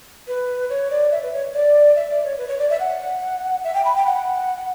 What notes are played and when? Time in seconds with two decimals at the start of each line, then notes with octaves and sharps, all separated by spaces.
0.27 B4
0.69 C#5
0.91 D5
1.11 E5
1.22 B4
1.33 C#5
1.54 D5
1.96 E5
2.10 D5
2.24 C#5
2.38 B4
2.48 C#5
2.59 D5
2.70 E5
2.80 F#5
3.64 E5
3.75 G5
3.85 B5
3.96 G5
4.06 F#5